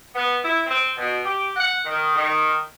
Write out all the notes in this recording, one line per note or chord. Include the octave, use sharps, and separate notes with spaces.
B3
E4
C4
B2
G4
F#5
D#3
D#3